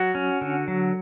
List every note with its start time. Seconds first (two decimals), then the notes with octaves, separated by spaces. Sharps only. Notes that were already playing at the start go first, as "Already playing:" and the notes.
Already playing: F#3 F#4
0.15 C#4
0.41 D3
0.68 F#3